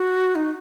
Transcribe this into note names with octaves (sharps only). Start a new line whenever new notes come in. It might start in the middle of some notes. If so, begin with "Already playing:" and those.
Already playing: F#4
D#4